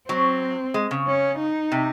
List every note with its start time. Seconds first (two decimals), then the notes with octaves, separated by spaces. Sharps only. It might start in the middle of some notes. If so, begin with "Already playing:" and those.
0.09 F#3 C4
0.74 G#3
0.91 C#3
1.07 C#4
1.39 D#4
1.72 C3